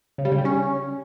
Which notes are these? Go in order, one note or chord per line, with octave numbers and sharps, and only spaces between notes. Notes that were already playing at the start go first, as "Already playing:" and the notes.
C#3
G3
C#3
G3
C#4